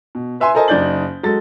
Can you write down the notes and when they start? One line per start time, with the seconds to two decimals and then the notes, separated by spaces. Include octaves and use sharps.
0.15 B2
0.40 B4 E5 G#5 C6
0.55 A4 A#4 C5 D#5 G#5 A5
0.68 F#1 D#4 D5 G6 A6 F#7
1.23 F#3 G#3 A4 A6